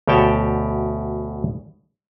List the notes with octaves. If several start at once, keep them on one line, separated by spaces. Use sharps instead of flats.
D2 B2 G4 C#5 G5 A5